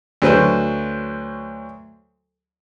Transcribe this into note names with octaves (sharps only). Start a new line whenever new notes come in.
D2 F#3 B4 C5